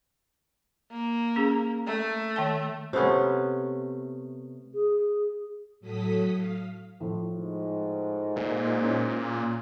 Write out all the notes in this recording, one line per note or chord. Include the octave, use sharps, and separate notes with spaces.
A#3
C#4 G#4
A3
D#3 G5 A5
C3 A3 B3 C#4
G#4
A2 F#3 A4 D#6 B6
F5
A2 F3
G#2
A#2
C#4 E4 C#5